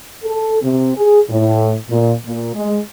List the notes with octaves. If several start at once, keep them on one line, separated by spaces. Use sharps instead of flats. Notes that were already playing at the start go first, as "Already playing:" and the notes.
A4
C3
G#4
A2
A#2
A#2
G#3